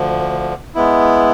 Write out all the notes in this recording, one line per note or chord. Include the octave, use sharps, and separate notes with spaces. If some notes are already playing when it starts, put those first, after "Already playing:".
Already playing: D2 D3 F3
G#3 B3 E4